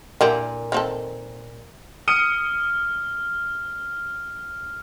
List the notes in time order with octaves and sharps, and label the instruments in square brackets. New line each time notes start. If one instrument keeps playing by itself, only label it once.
[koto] A#2 [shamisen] D3 E4 G4
[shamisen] D#3 C4 A4
[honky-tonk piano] D#6 C#7 D#7 [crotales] F6